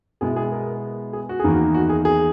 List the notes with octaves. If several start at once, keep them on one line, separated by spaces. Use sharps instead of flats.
B2 G#3 B3 E4 G#4
G#4
A#4
G#4
F#4
E2 D#3 A#3 D#4 G#4
F#4
F#4
G#4
G#4